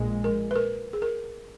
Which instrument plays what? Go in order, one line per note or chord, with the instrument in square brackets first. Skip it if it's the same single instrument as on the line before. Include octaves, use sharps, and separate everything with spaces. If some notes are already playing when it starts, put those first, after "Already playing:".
Already playing: [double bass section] A#1 A#2 G#3
[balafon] A#4
B4
A#4
G#4
A#4